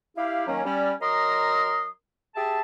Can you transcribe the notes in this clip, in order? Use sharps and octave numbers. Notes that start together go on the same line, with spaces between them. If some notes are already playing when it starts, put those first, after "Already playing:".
E4 G4 F5
D#3 F#3 A#3 C#4
G3 C#4 D5
F#3 A#4 D#5 A#5 C6 D#6
G4 G#4 E5 A5